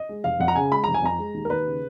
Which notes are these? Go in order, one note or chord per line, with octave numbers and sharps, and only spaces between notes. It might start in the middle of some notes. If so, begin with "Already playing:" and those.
Already playing: D#5
G#3
F1 F5
F2 F#5
A#5
C#3 G#5
G#3 B5
F1 A#5
G#5
F2 A#5
G#3
D#2
A#4
D#2 B4
C#3